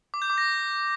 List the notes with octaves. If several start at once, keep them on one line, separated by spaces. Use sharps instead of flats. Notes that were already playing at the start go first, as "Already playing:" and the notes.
D6
G6
D6
A#6